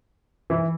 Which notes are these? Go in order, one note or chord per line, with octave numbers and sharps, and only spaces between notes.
E3 E4